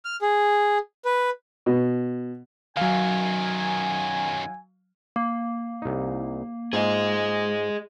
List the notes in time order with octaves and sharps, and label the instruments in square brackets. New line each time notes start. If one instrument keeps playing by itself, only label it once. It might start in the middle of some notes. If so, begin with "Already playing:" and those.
[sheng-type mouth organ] F6
G#4
B4
[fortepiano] B2
[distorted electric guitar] F#2 D#3 [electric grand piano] F#3 F5 [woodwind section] G#5
[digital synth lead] A#3
[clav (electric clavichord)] C2 D#4
[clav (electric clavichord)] G#2 F4 G#5 [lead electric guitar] G#4 D#5